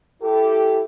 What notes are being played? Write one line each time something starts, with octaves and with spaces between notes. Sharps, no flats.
E4 G4 A4